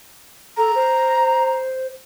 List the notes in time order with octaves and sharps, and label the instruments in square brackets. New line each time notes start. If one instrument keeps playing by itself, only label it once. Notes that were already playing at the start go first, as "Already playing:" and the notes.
[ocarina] A4 [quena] A#5
[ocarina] C5